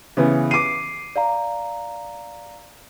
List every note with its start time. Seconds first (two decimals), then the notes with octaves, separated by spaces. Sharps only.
0.17 C#3 E3 B3
0.51 D6 C7 D#7
1.16 D5 F5 A#5